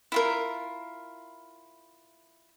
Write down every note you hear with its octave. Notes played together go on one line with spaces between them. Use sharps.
E4 F4 A#4